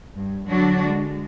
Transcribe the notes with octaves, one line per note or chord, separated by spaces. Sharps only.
G2
D3 F#3 D4 F#4
G#3